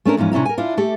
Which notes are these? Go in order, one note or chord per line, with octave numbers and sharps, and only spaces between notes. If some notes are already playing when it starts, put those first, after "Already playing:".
A3 C#4 D4 A#4
E2 G#2 F3 C#4
C3 C#4 D4 E4 A#5
A#4 G#5
D4 E4 F4
A3 G4 A4